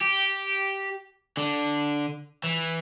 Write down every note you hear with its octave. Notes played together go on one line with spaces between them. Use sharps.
G4
D3
E3